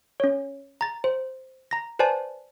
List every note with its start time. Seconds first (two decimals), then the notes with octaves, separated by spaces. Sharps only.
0.20 C#4 C#5
0.81 A#5 A6
1.04 C5
1.71 A#5 A#6
1.99 B4 C5 D5 G#5 A5